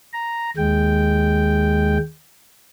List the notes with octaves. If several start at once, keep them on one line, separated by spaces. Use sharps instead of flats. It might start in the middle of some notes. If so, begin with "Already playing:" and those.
A#5
D#2 G#3 G5